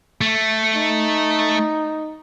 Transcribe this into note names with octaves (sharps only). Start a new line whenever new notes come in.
A3
D#4